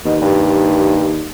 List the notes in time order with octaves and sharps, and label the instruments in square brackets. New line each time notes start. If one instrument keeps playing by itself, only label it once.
[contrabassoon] D#2 [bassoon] B2
[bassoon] G2